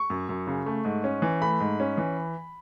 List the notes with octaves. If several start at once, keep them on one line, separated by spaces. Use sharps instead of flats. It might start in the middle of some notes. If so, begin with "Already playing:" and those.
Already playing: C#6
F#2
F#2
C#3
A3
G#2
C#4
E3
A3 B5
G#2
C#4
E3